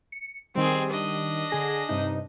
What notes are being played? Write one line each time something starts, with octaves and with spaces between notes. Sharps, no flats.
C#7
D#3 G3 C4 G#4
D4 D#5
D3 G#4 A#6
G2 C3 D#4